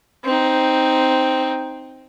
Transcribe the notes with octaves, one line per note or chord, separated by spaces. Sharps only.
C4 D#4